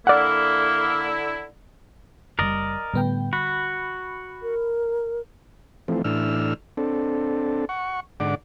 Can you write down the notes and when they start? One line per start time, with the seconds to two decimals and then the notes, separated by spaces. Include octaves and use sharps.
0.07 D3 A#3 E4 D5 F#5
2.39 F#1 B2 G3 A#4 D5 D#5
2.94 A2 D3 G3 B3 G5
3.33 F#4 B5
4.43 A#4
5.88 E3 F3 A3 C4
6.04 A2 E3 D4 E6 F6
6.77 C4 D4 A4
7.69 F#5 C#6
8.20 G#2 D3 D5 F#5 D6